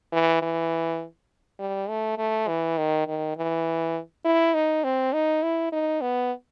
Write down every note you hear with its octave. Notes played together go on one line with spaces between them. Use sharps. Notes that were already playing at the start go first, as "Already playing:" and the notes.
E3
E3
G3
A3
A3
E3
D#3
D#3
E3
E4
D#4
C4
D#4
E4
D#4
B3